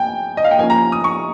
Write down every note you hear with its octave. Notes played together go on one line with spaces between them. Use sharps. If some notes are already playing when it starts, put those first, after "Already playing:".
Already playing: G5 G#5
D#5
F5
G5
F3 A#3 C#4 G#5
A#5
D#6
C#6